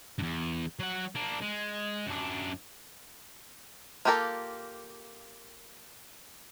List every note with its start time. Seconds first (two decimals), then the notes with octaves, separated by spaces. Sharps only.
0.19 E2 G2
0.79 F#3 F#5
1.15 A#3 D4
1.42 G#3
2.07 F#2 D4
4.05 A#3 F4 G4 A4 A#4